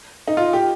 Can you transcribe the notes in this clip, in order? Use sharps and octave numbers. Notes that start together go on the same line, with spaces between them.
D#4
F4
G4